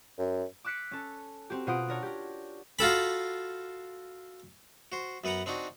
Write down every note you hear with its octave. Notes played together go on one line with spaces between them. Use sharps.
F#2
D6 E6 F#6 B6 C#7 D7
C#4 A4
C4 F#4 G4
B2 F4 C5 F#5 D#6 D7
D4 A#4 C#5
G4 A#4
F4 F#4 A4 B5
F#4 C5
F#2 B3 B4 F#5 A#5
C4 D4 D#4 F#4